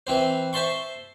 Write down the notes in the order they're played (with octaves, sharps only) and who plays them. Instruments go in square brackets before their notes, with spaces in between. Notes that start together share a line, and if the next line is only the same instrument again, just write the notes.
[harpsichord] E3 C4 C5
C5 E5 A5 C6 C#6